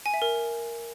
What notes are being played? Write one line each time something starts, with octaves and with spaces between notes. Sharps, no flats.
G#5
E5
A#4